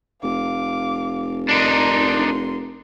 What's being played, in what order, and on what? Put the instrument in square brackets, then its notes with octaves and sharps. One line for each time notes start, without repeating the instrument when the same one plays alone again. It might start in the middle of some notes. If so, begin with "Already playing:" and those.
[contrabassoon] F1 [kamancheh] F5 D6
[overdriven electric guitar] D4 D#4 [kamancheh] A#4 C6